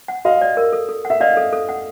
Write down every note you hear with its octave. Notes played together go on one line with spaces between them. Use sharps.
F#5
F#4 D#5 F5
D5
A#4
A4
A4
F#5
E5
D5 D#5 F5
A4
A4
F#5